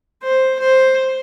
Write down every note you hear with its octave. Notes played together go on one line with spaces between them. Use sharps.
C5
C5